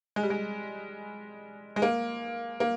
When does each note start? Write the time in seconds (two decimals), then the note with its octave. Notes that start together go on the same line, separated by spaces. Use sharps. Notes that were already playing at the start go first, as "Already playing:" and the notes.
0.16 G#3
0.23 G3
0.30 G#3
1.76 G#3
1.82 A#3
2.60 A#3